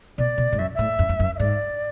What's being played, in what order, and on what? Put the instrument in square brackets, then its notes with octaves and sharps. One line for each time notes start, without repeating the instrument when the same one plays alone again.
[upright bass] B2 [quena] D5
[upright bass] B2
G#2
[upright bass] F#2 [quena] E5
[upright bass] A2 [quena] E5
[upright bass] F#2
F#2
F#2
[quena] E5
[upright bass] G#2 [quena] D5